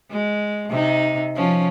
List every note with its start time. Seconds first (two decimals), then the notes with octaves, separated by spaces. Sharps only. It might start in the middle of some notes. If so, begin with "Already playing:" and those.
0.10 G#3
0.70 C3 D#4
1.35 F3 C#4